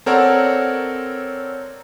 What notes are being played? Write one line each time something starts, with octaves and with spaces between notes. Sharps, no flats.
C4 A4 A#4 C#5 D5 F#5